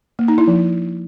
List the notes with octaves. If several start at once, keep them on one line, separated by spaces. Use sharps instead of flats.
A#3
D#4
E4
F3